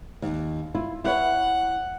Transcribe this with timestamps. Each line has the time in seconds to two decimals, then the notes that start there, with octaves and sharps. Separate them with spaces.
0.22 D#2
0.75 E4 F4
1.04 E4 B4 C#5 F#5